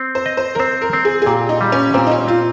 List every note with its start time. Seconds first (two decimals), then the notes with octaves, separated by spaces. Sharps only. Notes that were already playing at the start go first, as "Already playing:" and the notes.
Already playing: C4
0.15 C5
0.26 D#5
0.37 C5
0.55 A#4
0.59 C4 C5
0.82 A#4
0.93 C4
1.05 G#4
1.22 G#4
1.26 A#2 G4
1.49 D#4
1.61 G3
1.72 C#4
1.94 A#2 C4
2.07 D#4
2.11 C#4
2.28 C4 F4